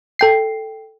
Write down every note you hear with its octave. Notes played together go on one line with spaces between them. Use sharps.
A4 G5 C7